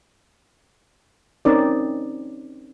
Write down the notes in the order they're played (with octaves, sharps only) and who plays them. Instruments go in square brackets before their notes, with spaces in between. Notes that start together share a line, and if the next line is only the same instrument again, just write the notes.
[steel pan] C4 C#4 D#4 A#4 C#5 D5